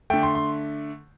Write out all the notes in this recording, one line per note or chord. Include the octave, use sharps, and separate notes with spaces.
D3 A3 G5
C6
C6